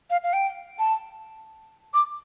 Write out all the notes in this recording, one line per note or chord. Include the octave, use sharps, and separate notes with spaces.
F5
F5
G5
A5
D6